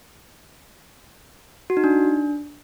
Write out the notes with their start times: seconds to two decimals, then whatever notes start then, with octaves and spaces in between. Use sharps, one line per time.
1.70 F#4
1.77 D#4
1.84 D4